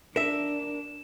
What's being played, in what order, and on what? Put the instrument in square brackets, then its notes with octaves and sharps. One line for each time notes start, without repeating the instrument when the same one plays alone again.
[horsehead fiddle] D4 [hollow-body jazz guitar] A#4 E5 [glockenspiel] E7